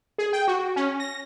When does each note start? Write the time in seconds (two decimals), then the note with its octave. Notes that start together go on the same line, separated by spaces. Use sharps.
0.18 G#4
0.33 G5
0.48 F#4
0.76 C#4
1.00 A#6